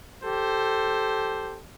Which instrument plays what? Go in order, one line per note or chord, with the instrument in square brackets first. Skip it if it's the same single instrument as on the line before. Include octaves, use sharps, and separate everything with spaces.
[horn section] G4 A4 C5